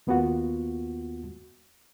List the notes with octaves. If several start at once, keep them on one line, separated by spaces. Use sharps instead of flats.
D#2 A#3 B3 F4 F#4 F#5